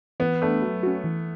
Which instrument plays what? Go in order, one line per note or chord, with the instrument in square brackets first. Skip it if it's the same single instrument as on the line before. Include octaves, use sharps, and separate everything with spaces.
[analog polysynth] E3 [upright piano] B3
[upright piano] A3 [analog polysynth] B3 D4
[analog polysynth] F#3
C#4 F#4
E3